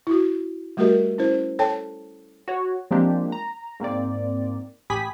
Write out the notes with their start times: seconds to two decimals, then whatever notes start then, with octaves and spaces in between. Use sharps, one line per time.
0.07 E4 F#4
0.77 G3 A3 F#4 G4 A#4 D#5
1.18 C#4 E4 C5
1.59 A4 C#5 G5 A5
2.48 F#4 C#5
2.91 F3 G#3 A#3 C4 D4 G4
3.32 A#5
3.80 G#2 A#3 C4 D5
4.90 A1 G4 G#5 B5 D#6 B6